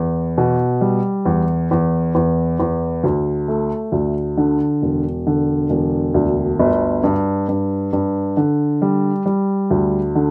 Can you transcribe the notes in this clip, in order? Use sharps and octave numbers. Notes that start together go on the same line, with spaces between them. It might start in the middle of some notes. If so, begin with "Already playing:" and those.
Already playing: E2
B2
G3
E2
E2
E2
E2
D2
A3
D2
D3
E1
D3
E1
D2
G1
G2
G2
G2
D3
G3
G3
D2
D3